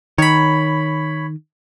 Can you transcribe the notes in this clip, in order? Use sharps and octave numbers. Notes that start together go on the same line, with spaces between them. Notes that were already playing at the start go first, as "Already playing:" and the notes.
D#3 C#5 B5